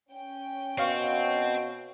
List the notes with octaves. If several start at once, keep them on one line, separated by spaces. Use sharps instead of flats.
C#4 G5
B2 C4 C#5 F5 C#6